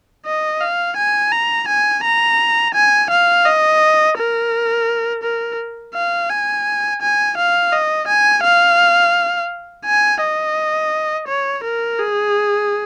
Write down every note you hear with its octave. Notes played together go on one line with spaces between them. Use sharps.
D#5
F5
G#5
A#5
G#5
A#5
G#5
F5
D#5
A#4
A#4
F5
G#5
G#5
F5
D#5
G#5
F5
G#5
D#5
C#5
A#4
G#4